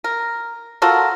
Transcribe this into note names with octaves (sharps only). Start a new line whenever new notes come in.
A#4
F4 F#4 A4 A#4